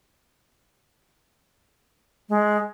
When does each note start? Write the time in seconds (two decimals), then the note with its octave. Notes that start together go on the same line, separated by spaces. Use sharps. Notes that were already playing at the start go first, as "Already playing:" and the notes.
2.29 G#3